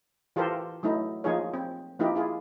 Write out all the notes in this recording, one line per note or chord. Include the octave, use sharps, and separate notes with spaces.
E3 F4 G4 A4 A#4 C5
F#3 A3 D#4 E4
F3 A#3 D#4 F4 G#4 C#5
C4
F3 A#3 D#4 E4 G4
E4 F4 G#4